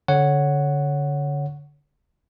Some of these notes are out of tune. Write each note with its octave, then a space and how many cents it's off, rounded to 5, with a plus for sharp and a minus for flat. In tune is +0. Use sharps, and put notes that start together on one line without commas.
D3 -25 C#5 +0 F#5 +0